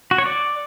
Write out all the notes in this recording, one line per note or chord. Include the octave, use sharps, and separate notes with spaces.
F#4
C#5
D5